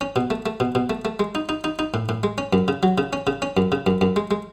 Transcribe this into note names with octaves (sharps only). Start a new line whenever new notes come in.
C#4
B2
A3
A3
B2
B2
A3
A3
G#3
D#4
D#4
D#4
D#4
A2
A2
G#3
C#4
F#2
C#3
F#3
C#3
C#4
C#3
C#4
F#2
C#3
F#2
F#2
G#3
G#3